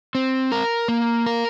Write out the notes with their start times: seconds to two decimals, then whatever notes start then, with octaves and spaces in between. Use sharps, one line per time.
0.15 C4
0.52 A#4
0.88 A#3
1.26 A#4